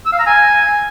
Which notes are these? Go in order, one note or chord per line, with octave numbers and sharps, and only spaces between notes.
E6
F5
A#5
G#5